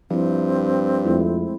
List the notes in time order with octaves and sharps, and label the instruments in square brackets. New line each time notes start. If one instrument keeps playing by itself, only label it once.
[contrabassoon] G2 [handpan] F3 E4 [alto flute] C4
[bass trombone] F2 [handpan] G#3 A3 E4